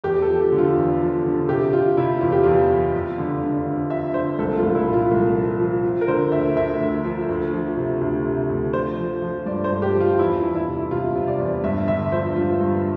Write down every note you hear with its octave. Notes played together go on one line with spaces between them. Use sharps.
E2 G4
A4
F3
G4
D3
F4
E2
F3
D3
C3 G4
C3 F4
C3 E4
E2 F4
G4
E2 F4
E2
F2
D3
D3
D3
F3 E5
D3 C5
C2 A4
F4
C2
E4
A#2
F4
C2
F3
F3
F3
A#4
D3 C5
D2 E5
D2 E5
D2
F3
D2
F3
C3
D2
C3
D2
F3 C5
F3
F3
G2 D5
C5
G2
G4
F3
F4
E2 E4
E2
E4
C3
C3 F4
C3
D5
E2
G2 E5
D3 E5
F3 C5
G2 F4
G2